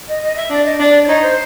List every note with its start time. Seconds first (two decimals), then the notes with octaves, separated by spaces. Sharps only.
0.08 D#5
0.23 D#5
0.36 E5
0.50 D4 D5
0.65 D#5
0.79 D4 D5
1.04 D5
1.08 D#4 C#5
1.22 C5